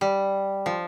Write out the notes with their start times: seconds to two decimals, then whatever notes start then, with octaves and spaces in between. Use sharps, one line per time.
0.01 G3
0.66 F3